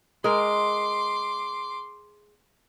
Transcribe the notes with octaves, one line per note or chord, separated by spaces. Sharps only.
G#3 A#4 C6 D6